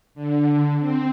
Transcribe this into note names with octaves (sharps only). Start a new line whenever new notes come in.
D3
C4